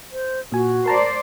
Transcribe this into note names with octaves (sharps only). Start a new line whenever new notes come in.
C5
A#2 F#4 G#5
A#4 C5 D5 A5 A#5